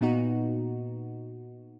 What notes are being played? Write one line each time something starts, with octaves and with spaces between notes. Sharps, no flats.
A#2 B3 D#4 F#4